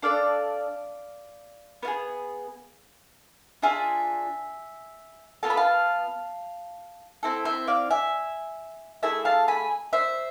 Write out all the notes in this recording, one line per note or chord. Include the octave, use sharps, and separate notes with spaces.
D4 A4 D5 F5
B3 F4
G#4
D4 F4 G#4 E5 G#5
B3 F4 A4 A5
B5
F5 A5
C4 E4 A4
C5 E5
D5 F5
E5 G#5
A3 E4 G#4 E5 G#5
F5 A5
G#5 B5
C5 E5